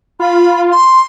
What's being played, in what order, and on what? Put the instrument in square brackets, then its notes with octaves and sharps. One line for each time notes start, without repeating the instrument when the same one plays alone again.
[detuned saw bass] F4 [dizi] B5
[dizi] C6